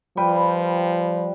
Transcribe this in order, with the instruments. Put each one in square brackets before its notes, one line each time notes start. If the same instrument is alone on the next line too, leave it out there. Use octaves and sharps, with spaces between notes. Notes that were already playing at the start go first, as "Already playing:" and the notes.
[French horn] F3 [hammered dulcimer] G3 B4 G5